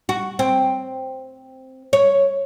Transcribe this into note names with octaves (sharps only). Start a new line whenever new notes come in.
F#4
C4
C#5